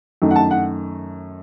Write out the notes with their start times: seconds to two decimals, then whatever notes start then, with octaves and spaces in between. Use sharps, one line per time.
0.22 F#2 D#3 A3 D#4
0.31 F#5
0.36 A5
0.51 F#5